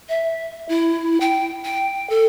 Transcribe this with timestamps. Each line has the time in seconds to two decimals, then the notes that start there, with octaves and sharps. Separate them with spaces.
0.09 E5
0.69 E4
1.21 G5
1.65 G5
2.10 A4